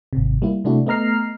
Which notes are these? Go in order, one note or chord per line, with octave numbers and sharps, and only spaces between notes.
G#1 C3
G3 A#3 E4
C3 A3 D4 E4 F#4
A3 B3 D#5 A#5 F6 C7